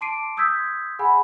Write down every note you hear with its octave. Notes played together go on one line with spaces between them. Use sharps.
A5 C6 D6 C7 D7 D#7
C6 D#6 E6 G6 G#6 B6
G#4 F#5 G#5 B5